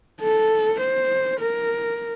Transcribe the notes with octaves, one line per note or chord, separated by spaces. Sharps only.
A4
C5
A#4